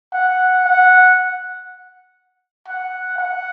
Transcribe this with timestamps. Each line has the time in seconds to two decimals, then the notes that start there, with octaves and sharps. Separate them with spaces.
0.13 F#5
0.65 F#5
2.68 F#5
3.18 F#5